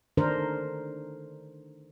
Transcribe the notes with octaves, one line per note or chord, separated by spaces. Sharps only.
D3 D#3 D4 A#4 C5